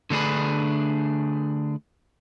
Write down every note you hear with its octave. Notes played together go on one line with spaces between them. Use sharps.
D3 A3 D4 G#4 B4